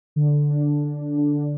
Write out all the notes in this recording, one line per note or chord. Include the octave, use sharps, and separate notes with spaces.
D3
D3
D4
D3
D4
D3
D3
D3